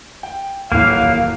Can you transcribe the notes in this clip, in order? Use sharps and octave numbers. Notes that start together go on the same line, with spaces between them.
G5
D#1 E3 F#3 A#3 F5